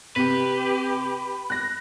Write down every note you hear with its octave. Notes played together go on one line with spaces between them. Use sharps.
C3 G4 B4
F#6 A#6